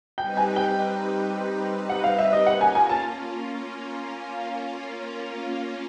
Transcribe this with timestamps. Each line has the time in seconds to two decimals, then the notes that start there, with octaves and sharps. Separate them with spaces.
0.18 G3 C4 D#4 G4 B4 G5
0.37 G#5
0.56 G5
1.90 F#5
2.04 F5
2.18 E5
2.33 D#5
2.47 A#3 C#4 F4 F#5
2.61 G#5
2.75 G#5
2.89 A5